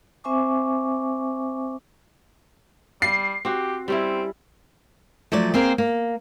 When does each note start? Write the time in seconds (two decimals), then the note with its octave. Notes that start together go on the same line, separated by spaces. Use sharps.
0.24 C4 C5 E5 G#5 C#6 D6
3.02 G3 C7
3.45 C4 F#4 G4
3.88 G3 C4 C#4 E4
5.32 F3 F#3 A3 D5
5.54 A#3 C4 G#4 A#4
5.78 A#3